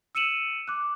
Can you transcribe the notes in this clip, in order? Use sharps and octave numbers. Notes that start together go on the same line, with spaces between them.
E6 C#7 D#7 E7 F#7
D6 F#6